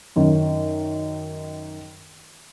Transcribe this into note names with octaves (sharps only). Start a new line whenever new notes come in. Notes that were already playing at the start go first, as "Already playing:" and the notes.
F#2 D#3